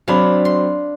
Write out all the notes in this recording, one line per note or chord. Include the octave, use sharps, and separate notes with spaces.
F#3 C4 D4 F5 B5
C6